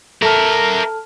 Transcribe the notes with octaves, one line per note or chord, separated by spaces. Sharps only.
A4 A#4 E5 A5 F6